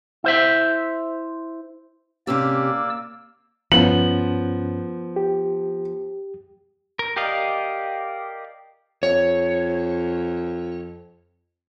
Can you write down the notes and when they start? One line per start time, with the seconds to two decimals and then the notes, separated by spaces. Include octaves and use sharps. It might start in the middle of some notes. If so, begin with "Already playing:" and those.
0.24 E4 C5 E5
2.27 C3 A#3 C#4 G4 D5 E6
3.72 G2 F3 B3 C#4 F#7
5.16 G4
6.99 A#4
7.16 G4 A#4 D5 D#5 F5
9.03 F2 C#5